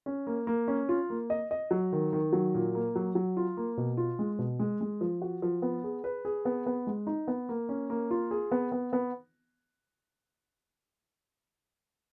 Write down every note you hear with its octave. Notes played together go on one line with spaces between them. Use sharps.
C#4
A#3
A#3
C#4
F4
A#3
D#5
D#5
F#3
D#3
D#3
F#3
A#2
A#3
F#3
F#3
F4
A#3
B2
F4
G#3
B2
G#3
G#3
F3
F#4
F3
B3
G#4
B4
G#4
B3
B3
G#3
D#4
B3
A#3
C#4
A#3
F4
G#4
B3
B3
B3